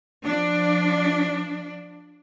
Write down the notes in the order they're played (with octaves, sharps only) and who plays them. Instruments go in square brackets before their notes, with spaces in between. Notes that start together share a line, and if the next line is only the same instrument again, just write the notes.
[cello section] F3 D4